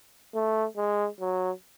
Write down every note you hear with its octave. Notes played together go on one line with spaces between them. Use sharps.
A3
G#3
F#3